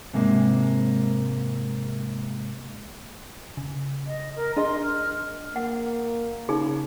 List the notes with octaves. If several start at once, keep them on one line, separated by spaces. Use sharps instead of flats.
G#2 C3 G#3 A#3
C#3
D#5
A#4
D4 G#4 D#5 C6
F6
A#3 F#5
C#3 D#4 G#4